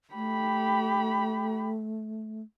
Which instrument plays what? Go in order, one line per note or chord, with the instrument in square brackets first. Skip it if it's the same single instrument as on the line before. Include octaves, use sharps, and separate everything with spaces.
[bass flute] A3 [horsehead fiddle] G4 B5